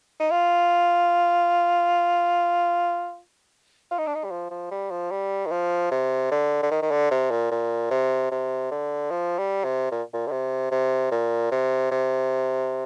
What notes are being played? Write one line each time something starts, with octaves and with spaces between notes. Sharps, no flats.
D#4
F4
F4
D#4
D4
D#4
G3
F3
F3
G3
F3
G3
D#3
F3
C3
D3
D3
D#3
D#3
D3
C3
A#2
A#2
C3
C3
D3
F3
G3
C3
A#2
A#2
D3
C3
C3
A#2
C3
C3